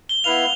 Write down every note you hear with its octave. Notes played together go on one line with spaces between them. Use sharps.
G7
B3 E4 B4 F5 F7